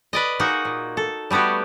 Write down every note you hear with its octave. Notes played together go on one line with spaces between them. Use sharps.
B4 D5 D#5
A#3 D#4 F#4 G#4 F#5
A#2
A4
G3 A3 B3 F#4 G4